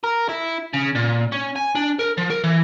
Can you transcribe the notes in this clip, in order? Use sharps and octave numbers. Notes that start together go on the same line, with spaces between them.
A#4
E4
C#3
A#2
C#4
G#5
D4
A#4
F3
A#4
E3